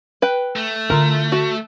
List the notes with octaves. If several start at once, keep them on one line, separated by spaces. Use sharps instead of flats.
B4 G5
A3
D3 E4 F4 A#4
F#4